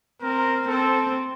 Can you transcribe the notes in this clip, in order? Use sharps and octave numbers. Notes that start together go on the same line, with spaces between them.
C4 A#4
C4 A4